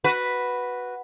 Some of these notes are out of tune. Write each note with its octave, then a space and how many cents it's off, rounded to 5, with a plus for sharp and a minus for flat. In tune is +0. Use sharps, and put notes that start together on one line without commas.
F#4 +0 B4 +0